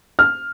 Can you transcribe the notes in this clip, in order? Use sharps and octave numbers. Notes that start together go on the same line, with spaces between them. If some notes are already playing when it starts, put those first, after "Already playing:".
F6